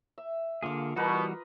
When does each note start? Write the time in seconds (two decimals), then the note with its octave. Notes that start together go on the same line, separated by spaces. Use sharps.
0.18 E5
0.63 D3 A#3 F4 G#4 D6
0.96 B2 E3 G3 F#4 A#4 B4 D#5